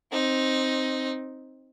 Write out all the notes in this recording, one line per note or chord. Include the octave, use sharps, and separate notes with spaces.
C4 D#4